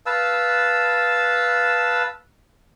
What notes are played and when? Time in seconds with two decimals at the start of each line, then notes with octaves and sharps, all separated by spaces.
0.06 B4 F5 A5 E6